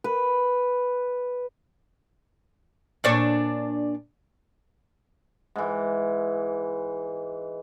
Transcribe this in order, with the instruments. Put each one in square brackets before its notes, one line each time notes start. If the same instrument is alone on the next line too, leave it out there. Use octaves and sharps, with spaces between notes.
[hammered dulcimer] B4
[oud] A#2 D4 C#5
[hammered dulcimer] G#2 E3